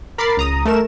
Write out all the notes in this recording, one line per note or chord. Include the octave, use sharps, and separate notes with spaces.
A#4 B5 D6 A6 C7
C#2 A#5 D#6
A3 A4 A#4 E7